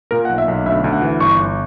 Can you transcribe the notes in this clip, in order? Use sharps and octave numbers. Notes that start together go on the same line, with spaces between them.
A#2 A#4
F#5
B1
E5
B1
D2 E5
D2
F#5
E3
G1 C#6
G1